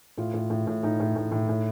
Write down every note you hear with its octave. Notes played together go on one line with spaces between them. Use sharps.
A2 F4
A2
A2
A2
A2 D#4
A2
A2
A2
A2